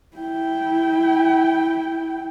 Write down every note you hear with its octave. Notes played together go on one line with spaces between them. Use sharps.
E4 G5